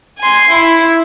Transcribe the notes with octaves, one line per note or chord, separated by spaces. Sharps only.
G#5 C6
E4